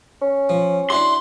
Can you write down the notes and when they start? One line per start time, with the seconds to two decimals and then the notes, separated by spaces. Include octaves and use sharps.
0.21 C#4
0.49 F3
0.90 D4 E4 F#4 C6